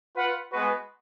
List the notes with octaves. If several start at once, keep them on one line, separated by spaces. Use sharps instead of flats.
F4 B4 F#5
G#3 B3 F#4 B4